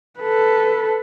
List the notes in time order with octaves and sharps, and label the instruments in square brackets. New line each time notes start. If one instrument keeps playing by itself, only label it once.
[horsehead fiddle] A4 B4